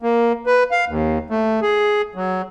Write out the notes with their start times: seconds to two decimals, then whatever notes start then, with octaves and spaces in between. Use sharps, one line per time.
0.02 A#3
0.46 B4
0.71 F5
0.88 D#2
1.30 A3
1.62 G#4
2.15 F#3